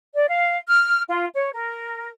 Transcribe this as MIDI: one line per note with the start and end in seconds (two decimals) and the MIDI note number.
0.14 0.26 74
0.27 0.57 77
0.68 1.02 89
1.08 1.26 65
1.34 1.51 73
1.54 2.09 70